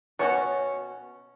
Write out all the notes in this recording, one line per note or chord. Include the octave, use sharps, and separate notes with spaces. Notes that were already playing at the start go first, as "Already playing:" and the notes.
B2 C#4 F#4 C#5